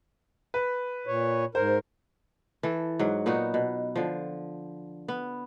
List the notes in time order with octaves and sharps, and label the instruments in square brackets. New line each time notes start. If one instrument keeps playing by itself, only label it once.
[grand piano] B4
[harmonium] A#2 C#5
[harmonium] G#2 A#4 [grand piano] C5
[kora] E3 A4
G#2 F#3
A#2 B3 D#4 F#4
B2
D3 F3
B3